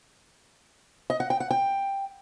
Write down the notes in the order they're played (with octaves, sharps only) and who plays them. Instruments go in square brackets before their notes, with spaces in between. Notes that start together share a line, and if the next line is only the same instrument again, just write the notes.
[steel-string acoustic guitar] D#5
F#5
G5
F#5
G5